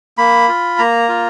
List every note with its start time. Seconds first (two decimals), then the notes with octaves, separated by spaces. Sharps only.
0.18 A#3 B5
0.48 F4
0.79 A#3 A#5
1.09 F4